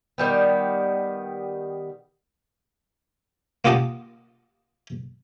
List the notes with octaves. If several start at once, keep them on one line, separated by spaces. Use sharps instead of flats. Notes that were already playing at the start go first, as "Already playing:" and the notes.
D#3 G3 B3
A#3 F4 G4 D#5 F#5 A5